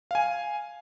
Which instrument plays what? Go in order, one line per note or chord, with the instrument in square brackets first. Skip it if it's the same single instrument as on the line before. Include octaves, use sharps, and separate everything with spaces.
[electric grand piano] F5 G#5